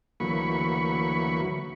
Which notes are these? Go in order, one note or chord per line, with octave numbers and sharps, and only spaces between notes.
D2 E3 F#3 A#3 B5 C#6